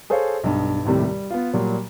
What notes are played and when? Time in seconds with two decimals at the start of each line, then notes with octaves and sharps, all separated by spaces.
0.10 G#4 A4 C5 C#5 F5
0.43 B1 G2
0.85 D#2 A2 C3 G3
1.03 G3
1.31 B3 F4
1.53 A#2 F#3 G3